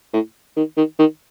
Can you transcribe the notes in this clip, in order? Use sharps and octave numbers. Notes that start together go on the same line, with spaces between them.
A2
D#3
D#3
D#3